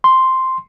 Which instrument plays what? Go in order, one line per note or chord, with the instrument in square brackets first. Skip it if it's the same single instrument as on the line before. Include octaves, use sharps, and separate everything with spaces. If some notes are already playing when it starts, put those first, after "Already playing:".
[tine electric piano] C6